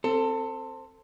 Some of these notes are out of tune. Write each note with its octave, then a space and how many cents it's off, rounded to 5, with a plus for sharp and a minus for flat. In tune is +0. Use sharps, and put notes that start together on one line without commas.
C4 +0 A4 +25